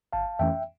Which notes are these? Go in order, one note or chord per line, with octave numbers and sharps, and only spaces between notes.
G1 F5 A5
F2 E3 A3 C#4 E5 G5